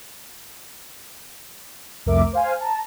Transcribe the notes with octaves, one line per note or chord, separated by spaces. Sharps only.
C2 F2 A3 A#4 E5 D6
C5 F5 G#5
A5 A#5